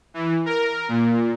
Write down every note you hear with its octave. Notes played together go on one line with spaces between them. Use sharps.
E3
A#4
A#2